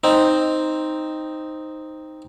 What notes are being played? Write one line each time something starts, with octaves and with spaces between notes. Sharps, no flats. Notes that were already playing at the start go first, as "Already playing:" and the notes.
C4 D#4